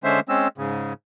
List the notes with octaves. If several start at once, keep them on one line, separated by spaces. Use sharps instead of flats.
D3 G#3 C#4 C5 E5
G#3 C4 C#4 E6
G#2 C#3